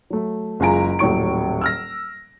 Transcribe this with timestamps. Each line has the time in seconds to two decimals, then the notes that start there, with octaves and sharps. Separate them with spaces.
0.10 F#3 A3
0.60 F#1 G#3 F4 G#5 A#5 D7
0.99 D#1 A2 F#3 C#6 D7
1.61 E6 F6 A#6